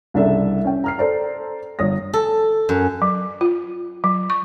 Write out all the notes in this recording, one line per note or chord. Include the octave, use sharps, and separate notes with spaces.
C2 C#3 D4 A4 E5
C#4 G5
A#5 F6 C7
A4 C5 D5 A#5
G1 C#5 D#6 A#6
A4
F#2
F#3
F4
F#3
C#6